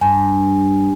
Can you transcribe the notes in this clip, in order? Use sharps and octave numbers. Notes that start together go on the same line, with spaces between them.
G2 G#5